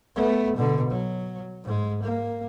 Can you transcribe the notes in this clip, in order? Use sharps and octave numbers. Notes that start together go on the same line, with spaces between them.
A3 B3
B2 D3
F#3
G#2 G#3
A#3